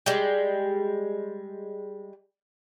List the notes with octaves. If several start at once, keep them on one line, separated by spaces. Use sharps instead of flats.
G3 G#3